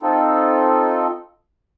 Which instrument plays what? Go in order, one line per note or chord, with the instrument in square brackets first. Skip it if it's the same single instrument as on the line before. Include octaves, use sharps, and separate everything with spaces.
[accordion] C4 D#4 F4 A4